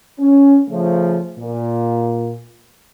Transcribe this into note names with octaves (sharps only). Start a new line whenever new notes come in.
C#4
C#3 F3 A3
A#2